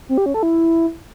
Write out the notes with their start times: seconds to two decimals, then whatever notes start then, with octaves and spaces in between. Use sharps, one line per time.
0.09 C4
0.18 G4
0.26 C#4
0.34 A4
0.43 E4